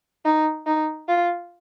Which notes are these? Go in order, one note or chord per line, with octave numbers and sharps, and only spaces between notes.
D#4
D#4
F4